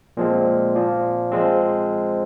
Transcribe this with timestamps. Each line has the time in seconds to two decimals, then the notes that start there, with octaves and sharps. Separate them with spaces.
0.17 A#2 F3 G#3 C4
0.75 A#2 F3 A#3
1.32 F3 G#3 C4